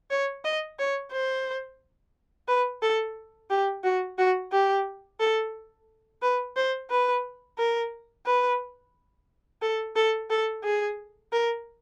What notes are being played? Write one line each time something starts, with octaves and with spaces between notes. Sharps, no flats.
C#5
D#5
C#5
C5
B4
A4
G4
F#4
F#4
G4
A4
B4
C5
B4
A#4
B4
A4
A4
A4
G#4
A#4